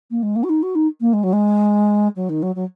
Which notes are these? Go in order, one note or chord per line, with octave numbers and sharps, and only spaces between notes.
A#3
G#3
A#3
F#4
D#4
F#4
D#4
A#3
G#3
F#3
G#3
F#3
D#3
F#3
F#3